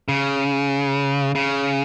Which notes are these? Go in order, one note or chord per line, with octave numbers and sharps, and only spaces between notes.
C#3
C#3